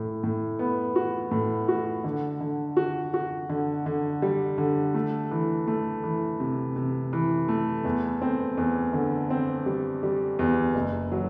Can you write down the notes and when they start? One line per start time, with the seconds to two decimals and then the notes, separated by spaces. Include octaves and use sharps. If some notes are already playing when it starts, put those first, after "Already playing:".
Already playing: A2
0.23 A2
0.59 B3
0.96 F#4
1.31 A2
1.68 F#4
2.04 D3
2.41 D3
2.77 F#4
3.14 F#4
3.49 D3
3.86 D3
4.22 G3
4.58 D3
4.94 A3
5.31 E3
5.67 A3
6.03 E3
6.40 C3
6.76 C3
7.13 E3
7.48 A3
7.84 E2
8.22 C4
8.57 E2
8.93 D3
9.30 C4
9.66 G3
10.03 G3
10.39 E2
10.75 F#1
11.12 F#3